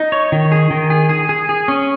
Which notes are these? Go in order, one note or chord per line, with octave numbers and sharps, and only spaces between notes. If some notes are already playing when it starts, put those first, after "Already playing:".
Already playing: D#4
C#5
D#3
G#4
D#3
G#4
G#4
G#4
G#4
C#4